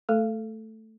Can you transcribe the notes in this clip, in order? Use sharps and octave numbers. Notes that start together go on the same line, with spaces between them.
A3 A4